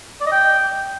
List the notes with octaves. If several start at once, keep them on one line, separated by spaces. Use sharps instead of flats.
D5
D#5
G5